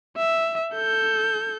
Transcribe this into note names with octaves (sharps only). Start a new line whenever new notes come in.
E5
A4 G6